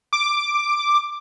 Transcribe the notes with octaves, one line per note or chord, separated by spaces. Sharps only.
D6